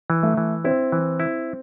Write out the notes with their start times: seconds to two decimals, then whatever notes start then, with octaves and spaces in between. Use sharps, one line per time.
0.10 E3
0.23 A3
0.37 E3
0.64 C4 E4
0.92 E3
1.20 E4